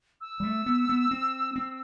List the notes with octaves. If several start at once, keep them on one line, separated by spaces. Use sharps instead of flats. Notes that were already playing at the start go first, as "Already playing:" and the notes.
E6
G3
A3
B3
B3
C4
C4